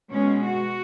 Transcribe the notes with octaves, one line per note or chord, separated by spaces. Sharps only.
B2 G#3 C#4
F#4